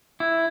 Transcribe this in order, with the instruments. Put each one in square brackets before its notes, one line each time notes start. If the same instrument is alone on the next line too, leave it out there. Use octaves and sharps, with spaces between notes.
[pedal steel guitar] E4